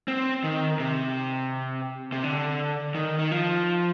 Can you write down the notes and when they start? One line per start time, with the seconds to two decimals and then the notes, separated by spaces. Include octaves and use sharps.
0.08 C4
0.44 D#3
0.80 C3
2.12 C3
2.24 D3
2.95 D#3
3.19 D#3
3.31 F3